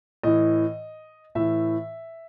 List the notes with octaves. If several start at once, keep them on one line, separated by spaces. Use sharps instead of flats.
A2 E3 D#5
A2 E3 E5